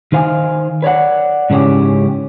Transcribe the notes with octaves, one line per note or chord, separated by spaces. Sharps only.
D#3 D#4 C5 F5 G#5
B4 C#5 D5 F#5
G#2 C#3 E3 C#4 G4